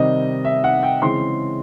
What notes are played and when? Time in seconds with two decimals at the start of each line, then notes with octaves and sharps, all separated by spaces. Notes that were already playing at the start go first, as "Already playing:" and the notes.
Already playing: C3 D#3 G3 C4 D#5
0.45 E5
0.64 F#5
0.83 G5
1.02 C#3 E3 G#3 C4 C6